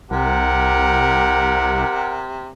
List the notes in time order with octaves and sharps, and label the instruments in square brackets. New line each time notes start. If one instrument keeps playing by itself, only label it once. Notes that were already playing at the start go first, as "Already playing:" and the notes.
[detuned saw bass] C2 [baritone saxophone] C3 [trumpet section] G4 A#4 F#5